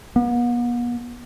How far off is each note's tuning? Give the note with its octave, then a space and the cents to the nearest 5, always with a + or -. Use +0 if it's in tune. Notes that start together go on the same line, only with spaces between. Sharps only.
B3 -45